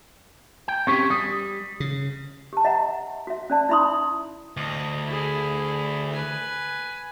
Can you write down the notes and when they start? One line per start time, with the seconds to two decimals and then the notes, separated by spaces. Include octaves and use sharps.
0.68 G5
0.87 C4 C#4 G4 C#6
1.10 G3 D#6
1.80 C#3
2.53 G4 A5
2.65 D#5 E5 F#5 A#5
3.27 F#4 E5
3.50 C#4 D5 A5
3.69 D#4 E4 E5 B5 C6 D#6
4.57 D2 D#5
5.07 E4 G#4
6.13 B4 G#5